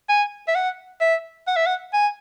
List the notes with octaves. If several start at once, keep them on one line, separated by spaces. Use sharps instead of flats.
G#5
E5
F#5
E5
F#5
E5
F#5
G#5